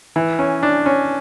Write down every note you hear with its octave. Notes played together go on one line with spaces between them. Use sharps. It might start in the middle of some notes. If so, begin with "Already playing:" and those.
E3
C#4
D4
C#4